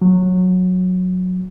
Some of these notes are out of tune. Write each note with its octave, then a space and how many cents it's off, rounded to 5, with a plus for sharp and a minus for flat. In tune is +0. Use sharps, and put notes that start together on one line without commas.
F#3 -15